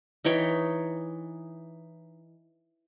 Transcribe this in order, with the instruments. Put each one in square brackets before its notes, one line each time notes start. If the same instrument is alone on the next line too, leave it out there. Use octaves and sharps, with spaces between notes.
[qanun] E3 D#4 C#5 G5